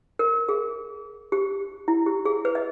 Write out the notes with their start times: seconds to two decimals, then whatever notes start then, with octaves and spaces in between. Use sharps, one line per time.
0.19 A#4
0.49 G#4
1.32 G4
1.88 E4
2.06 G4
2.25 G#4
2.45 B4
2.55 D#5